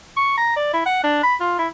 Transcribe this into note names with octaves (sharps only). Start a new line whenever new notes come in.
C#6
A#5
D5
E4
F#5
D4
B5
F4
E4